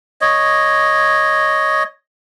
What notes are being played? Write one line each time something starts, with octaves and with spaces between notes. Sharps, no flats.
C#5 D#5